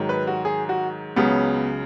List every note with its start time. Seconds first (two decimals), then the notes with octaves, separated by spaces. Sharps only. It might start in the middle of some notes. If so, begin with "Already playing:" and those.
Already playing: G#2 D#3 F#3
0.09 B4
0.27 F#4
0.45 G#4
0.69 F#4
1.16 C#2 C#3 F#3 B3